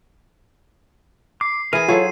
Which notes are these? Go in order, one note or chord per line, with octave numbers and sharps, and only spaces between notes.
D6 C7
E3 G#4 A#4 D#7
F#3 F4 G#4 A4 C5 C#5 A5